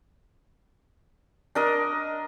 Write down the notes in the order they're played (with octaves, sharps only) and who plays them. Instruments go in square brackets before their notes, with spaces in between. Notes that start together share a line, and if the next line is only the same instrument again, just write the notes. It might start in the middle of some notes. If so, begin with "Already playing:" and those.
[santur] D4 A#4 D#5